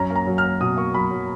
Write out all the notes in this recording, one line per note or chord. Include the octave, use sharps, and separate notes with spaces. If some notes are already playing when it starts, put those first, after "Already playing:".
Already playing: F#2 C#4 A#5
A#3
A#5
F#3
F6
A#3
B2 D#6
A#3 C#6
F#3 B5
F#3